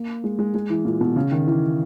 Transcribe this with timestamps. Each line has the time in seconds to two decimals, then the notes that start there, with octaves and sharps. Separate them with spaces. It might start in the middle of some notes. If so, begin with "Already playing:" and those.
Already playing: A#3
0.24 G#3
0.39 G#3
0.54 G#3
0.70 E3
0.85 A#2
1.01 B2
1.16 C#3
1.31 D#3
1.47 E3